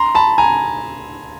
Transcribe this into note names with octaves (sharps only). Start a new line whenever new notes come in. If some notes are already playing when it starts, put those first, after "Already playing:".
Already playing: A#5 C6
A5 B5
G#5 A#5